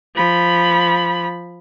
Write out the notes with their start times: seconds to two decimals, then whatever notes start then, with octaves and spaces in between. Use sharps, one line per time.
0.15 F3 B5